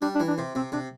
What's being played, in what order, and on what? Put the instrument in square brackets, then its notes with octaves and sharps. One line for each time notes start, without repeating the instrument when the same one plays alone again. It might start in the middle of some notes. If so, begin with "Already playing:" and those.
[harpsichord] G3 [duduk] D4
[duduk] D4
[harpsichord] E3
[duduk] D4
[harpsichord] C3
[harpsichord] C3 [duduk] C4
[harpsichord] C3 [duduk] D4